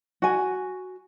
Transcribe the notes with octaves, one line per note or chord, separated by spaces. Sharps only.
F#4 G#5